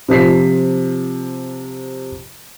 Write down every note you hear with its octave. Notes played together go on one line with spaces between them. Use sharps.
C3 F3 B6 C7